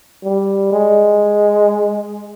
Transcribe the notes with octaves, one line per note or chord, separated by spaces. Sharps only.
G3
G#3